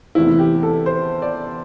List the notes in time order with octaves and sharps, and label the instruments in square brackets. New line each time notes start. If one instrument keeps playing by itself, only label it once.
[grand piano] E2 C3 A3 C4 E4
G4
A4
C5
D5